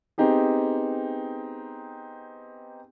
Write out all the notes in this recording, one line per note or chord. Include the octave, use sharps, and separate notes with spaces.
B3 C4 D#4 G4 G#4